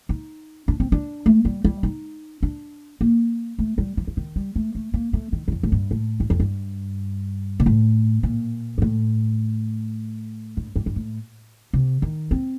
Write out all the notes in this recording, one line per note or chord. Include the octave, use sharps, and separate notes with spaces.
D#4
D4
C4
D4
A3
G3
G3
D#4
D4
A#3
A3
G3
F3
F3
D#3
G3
A3
A3
A#3
A3
D#3
G2
F2
A2
G2
A2
G2
F2
G2
A#2
A2
A#2
G2
A2
G2
G2
G2
A2
C3
D#3
C4